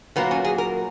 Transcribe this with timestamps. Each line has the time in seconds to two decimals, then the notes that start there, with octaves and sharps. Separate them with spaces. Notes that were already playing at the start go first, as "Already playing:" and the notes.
0.16 A#2 F#3 A#3 B3
0.31 C#4
0.45 G#4
0.58 A#4